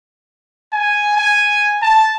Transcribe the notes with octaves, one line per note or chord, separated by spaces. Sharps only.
G#5
G#5
A5